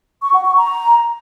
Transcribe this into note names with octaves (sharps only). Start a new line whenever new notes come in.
C#6
F#5
C#6
A#5